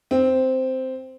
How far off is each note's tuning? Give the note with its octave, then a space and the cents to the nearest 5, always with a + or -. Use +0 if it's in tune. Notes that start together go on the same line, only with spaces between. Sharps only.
C4 -5